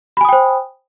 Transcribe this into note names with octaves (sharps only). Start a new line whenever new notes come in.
C5 G5 G#5 B5 D#6